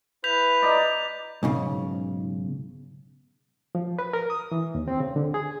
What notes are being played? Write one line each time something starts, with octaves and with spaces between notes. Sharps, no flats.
E4 B4 G6 B6 F7
D5 D#5 A#5
B1 G#2 C#3
F3
B4
A#4
D#6
E3
D#2
C4
C#3
D3
G#4